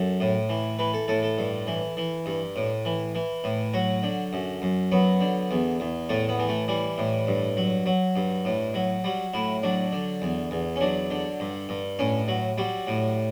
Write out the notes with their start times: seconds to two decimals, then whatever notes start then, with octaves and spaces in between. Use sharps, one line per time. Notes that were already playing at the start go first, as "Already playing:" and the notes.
Already playing: F#2 A4
0.20 A2
0.49 E3
0.79 E3 B4
0.93 A4
1.08 A2 A4
1.23 A4
1.38 G2
1.67 E3
1.97 E3
2.26 G2
2.56 A2
2.85 E3
3.15 E3
3.44 A2
3.74 F#3 F#4
4.03 D3
4.33 F#2
4.62 F#2
4.92 F#3 B3
5.21 D3
5.51 E2
5.80 E2
6.09 A2 A3
6.29 B3
6.39 E3
6.49 A3
6.68 E3 G3
6.98 A2
7.27 G2
7.57 F#3
7.86 F#3
8.16 G2
8.45 A2
8.74 F#3
9.04 F#3 G3
9.34 A2 E4
9.63 F#3 D4
9.92 D3
10.22 E2
10.51 E2
10.76 C#4
10.81 F#3 D4
11.11 D3
11.40 G2
11.69 G2
11.99 A2 C#4
12.28 F#3
12.58 F#3 G3
12.87 A2